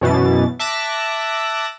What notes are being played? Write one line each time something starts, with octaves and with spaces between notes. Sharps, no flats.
F#2 B2 E3 A6
E5 A5 D6 E6 F#6 A#6